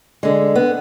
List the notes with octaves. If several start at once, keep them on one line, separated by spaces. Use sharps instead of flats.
D3 G#3
B3